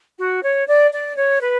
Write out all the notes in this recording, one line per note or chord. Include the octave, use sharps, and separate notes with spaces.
F#4
C#5
D5
D5
C#5
B4